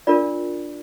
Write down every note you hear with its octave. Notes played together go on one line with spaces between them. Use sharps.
D4 F4 A#4 D5